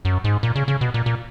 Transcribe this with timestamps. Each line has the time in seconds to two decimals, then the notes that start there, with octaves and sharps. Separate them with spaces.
0.05 F#2
0.24 G#2
0.43 A#2
0.56 C#3
0.68 C#3
0.81 B2
0.94 A#2
1.06 A#2